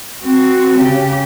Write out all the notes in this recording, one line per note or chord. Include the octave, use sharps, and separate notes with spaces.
C4 F#4
C#3 G4